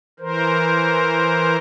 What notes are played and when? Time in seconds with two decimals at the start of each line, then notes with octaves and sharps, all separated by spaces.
0.20 E3 A#4 C5